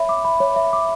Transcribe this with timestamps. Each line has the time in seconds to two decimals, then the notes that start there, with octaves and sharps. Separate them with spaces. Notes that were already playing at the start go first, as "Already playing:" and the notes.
Already playing: C#5 E5 B5
0.09 D6
0.25 B5
0.40 C#5
0.56 E5
0.73 D6